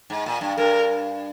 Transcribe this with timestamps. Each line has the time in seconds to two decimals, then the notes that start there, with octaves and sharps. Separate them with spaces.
0.10 G#2
0.26 A#2
0.41 G2
0.57 G2 A#4